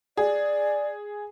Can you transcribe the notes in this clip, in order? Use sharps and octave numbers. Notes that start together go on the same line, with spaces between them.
G#4 D5